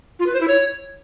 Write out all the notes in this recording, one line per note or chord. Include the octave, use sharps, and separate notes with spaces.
F4
B4
C5
E4
C#5